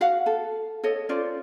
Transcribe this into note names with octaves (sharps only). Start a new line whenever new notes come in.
F#4 F5 F#5
A4
A4 C#5 D#5
C#4 F4 C5 D5